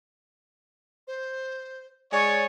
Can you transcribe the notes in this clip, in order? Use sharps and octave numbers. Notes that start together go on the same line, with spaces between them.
C5
G#3 C#5 D5